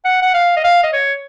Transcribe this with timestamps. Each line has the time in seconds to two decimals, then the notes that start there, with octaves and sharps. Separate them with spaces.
0.05 F#5
0.22 F#5
0.34 F5
0.56 D#5
0.64 F5
0.83 D#5
0.93 C#5